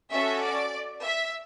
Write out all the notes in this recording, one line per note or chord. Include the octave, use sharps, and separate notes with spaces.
C#4 F#4 A4 E5
D5
E5